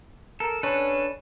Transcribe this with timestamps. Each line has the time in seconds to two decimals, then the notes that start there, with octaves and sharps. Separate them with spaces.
0.40 A4 A#4
0.63 C#4 D4 A4 B4